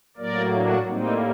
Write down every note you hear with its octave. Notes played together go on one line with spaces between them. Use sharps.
A2 F#3 A#3 A#4 D5
D4 F#4
A2 G3 A#3 C4 D#4